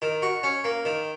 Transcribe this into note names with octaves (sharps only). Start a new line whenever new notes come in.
D#3
F#4
C#4
A#3
D#3